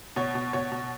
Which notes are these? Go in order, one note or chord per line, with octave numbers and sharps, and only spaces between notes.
B2 C#5
B2
B2 C#5
B2